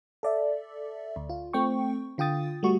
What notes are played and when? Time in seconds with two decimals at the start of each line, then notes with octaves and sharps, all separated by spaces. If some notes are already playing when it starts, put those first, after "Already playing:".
0.23 A4 D5 E5
1.16 D2
1.30 F4
1.53 A3 C4 G5 C#6
2.18 D3 F4 G5 D#6 A6
2.63 G3 A3 F#4 C#6